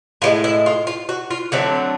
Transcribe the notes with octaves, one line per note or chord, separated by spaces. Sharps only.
A2 F3 G#3 F4
E4
F4
F4
F#4
F4
D3 F#3 A3 C4 E4